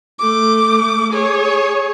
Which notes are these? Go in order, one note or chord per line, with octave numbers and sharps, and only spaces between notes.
A3 D6
G#4 C#5